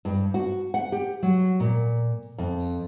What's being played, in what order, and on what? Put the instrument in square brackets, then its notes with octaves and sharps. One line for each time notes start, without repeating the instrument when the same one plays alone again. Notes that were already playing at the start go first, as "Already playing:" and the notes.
[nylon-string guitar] G2
F#4
F#5
G4
F#3
A#2
F2